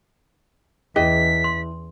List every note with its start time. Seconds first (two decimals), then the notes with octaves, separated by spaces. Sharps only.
0.96 E2 C#4 E4 G#4 D#5 B6
1.44 C6